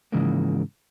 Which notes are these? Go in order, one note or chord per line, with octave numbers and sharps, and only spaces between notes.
G#2 C#3 E3 F3 G#3 A#3